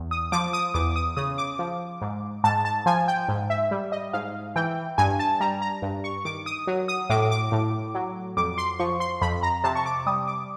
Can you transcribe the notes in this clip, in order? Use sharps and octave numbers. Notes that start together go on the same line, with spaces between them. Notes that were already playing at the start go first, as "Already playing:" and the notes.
Already playing: E2
D#6
F3 D6
D#6
E2 D6
D#6
C#3 D#6
D6
F3
G#2
G#2 A5
A5
F3 G#5
G5
G#2
E5
G3
D#5
G#2 F5
E3 G5
G2 G#5
A5
G3 A#5
A#5
G2
C#6
D#3 D6
D#6
F#3
D#6
A2 D6
D6
A2
F#3
F2 D6
C6
F3 C#6
C6
F2 B5
A#5
C3 A5
C#6
D6
G3 D#6
D6